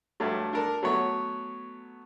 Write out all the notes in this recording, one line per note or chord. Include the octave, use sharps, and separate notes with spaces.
G2 F#3 A3
D4 A4 A#4
F#3 A3 B3 C#5